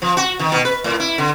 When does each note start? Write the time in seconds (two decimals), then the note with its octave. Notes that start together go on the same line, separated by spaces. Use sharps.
0.02 F3
0.17 F#4
0.40 D#3
0.52 B2
0.65 B4
0.84 A2
1.00 E4
1.18 D3